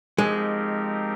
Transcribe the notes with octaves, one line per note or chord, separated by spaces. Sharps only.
F3 G#3 C4 D#4 G4 A#4